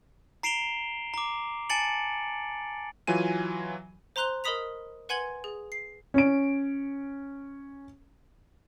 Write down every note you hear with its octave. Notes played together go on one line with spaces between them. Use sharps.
A#5 C7 D7 E7 F7 G7
A#5 D6
G#5 A5 A6 C#7 D7 F#7
E3 F#3 F4 G#5 D#7
C5 A#5 C6 F#6 F7 G7
A#4 D#5 B5 D#6 B6 F7
B4 F#5 G#5 C6 G#6 F#7
G#4
C7
C#4 D7